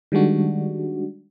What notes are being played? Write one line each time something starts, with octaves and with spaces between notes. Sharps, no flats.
D#3 G3 G#3 D4 F#4